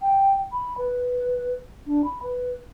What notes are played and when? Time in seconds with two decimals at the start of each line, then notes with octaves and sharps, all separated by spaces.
0.02 G5
0.52 B5
0.78 B4
1.87 D4
2.05 B5
2.23 B4